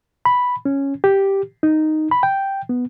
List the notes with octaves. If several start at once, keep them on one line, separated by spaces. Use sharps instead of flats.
B5
C#4
G4
D#4
B5
G5
B3